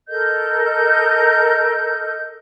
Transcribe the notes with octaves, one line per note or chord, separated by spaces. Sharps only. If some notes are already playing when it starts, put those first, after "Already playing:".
A4 A#4 D#5 G6